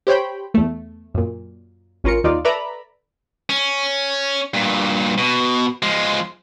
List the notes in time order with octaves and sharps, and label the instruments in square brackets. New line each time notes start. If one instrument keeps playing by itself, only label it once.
[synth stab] G4 C5 C#5 G5 B5
E2 A3
F#2 A#2
A1 C#4 F4 A#4 C#7
D#2 D#4 F4 D5
A4 B4 D5 E5 A#5 B5
[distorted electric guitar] C#4
G2 A#2
B2
F3 G#3